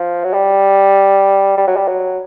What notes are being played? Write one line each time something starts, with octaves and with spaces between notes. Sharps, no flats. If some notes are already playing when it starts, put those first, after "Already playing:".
Already playing: F3
F#3
G3
G3
F#3
G3
F#3